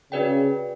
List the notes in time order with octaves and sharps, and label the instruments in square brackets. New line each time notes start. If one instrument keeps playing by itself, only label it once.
[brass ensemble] C#3 [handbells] D4 F#4 B4 D5 G5